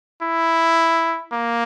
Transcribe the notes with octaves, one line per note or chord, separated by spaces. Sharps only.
E4
A#3